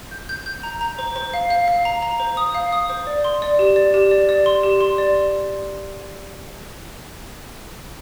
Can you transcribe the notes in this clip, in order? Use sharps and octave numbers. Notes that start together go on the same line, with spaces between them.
G6
G6
G6
A#5
A#5
C5
C5
F5
F5
F5
A#5
A#5
C5
D#6
F5
D#6
C5
D5
C6
D5
G4
D5
G4
D5
D5
C6
G4
C6
D5